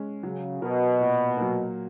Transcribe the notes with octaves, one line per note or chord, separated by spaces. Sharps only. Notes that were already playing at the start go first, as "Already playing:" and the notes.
Already playing: G#3 C#4
C#3 F#3
B2 B3 F#4 A#4
A#2
F#3 A#3